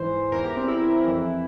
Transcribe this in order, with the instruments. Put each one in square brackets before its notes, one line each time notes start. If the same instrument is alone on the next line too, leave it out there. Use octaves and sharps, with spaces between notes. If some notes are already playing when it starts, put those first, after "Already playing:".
Already playing: [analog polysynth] G#2 E3 C5
E2 E3 A#4
G4
C4
E4
F2 E3